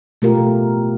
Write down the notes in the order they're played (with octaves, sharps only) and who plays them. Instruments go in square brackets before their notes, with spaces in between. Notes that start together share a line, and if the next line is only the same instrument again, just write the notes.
[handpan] B2 A3 F4 G4 A#4